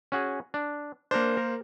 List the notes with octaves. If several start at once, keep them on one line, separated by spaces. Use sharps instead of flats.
C#4 F#4 G#4
D4
A#3 D4 A#4 C5
A#4